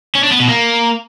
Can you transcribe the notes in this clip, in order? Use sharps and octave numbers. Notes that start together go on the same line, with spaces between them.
C#4
D4
B3
B2
A#3